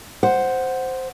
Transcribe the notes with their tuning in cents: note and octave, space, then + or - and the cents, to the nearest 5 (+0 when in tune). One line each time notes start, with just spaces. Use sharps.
C5 +0 F#5 +0